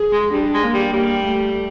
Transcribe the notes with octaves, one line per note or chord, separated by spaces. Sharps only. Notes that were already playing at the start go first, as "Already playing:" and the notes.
Already playing: G#4
G#3
G3 D4
G#3
A#3
G3
G3 A#3
A3